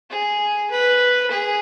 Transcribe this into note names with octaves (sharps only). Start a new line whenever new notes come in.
G#4
B4
G#4